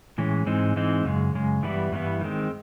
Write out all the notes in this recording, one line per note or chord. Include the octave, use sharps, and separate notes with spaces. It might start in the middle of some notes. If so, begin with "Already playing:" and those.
A2 E3 G#3 C#4
G#2 E3 G#3 C4 D#4
G#2 E3 G#3 C4 D#4
F#2 C#3 G#3
F#2 C#3 G#3
G2 E3 G3 B3 E4
G2 E3 G3 B3 E4
D#3 G#3 C4